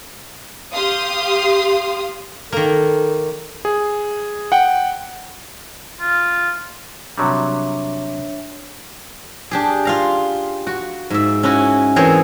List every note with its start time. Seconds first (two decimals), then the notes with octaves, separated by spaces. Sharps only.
0.73 G4 F5 C6 D#6
2.52 D#3 A#3 A4
3.65 G#4
4.52 F#5 G5
6.00 F4
7.18 C3 F#3 G3 D4 C#5 E5
9.51 D4 G4 G#4
9.85 F4 F5 A#5
10.67 F#4
11.10 G#2 E5
11.43 C#4 E4 F#4 G#5
11.96 E3 C4 G#4 A#4 C5 C#5